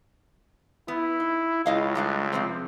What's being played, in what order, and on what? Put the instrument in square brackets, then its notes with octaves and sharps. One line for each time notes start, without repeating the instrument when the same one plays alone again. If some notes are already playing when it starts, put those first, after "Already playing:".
[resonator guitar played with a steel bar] B3 [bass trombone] E4
[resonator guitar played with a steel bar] D#4
[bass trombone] C#2 [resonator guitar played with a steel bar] E4 D#5 F5
[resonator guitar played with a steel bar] G3 A3 D4
C3 F3 C4